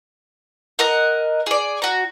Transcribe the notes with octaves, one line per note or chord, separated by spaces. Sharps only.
A#4 D#5 F#5
G#4 D5
F#4 A#5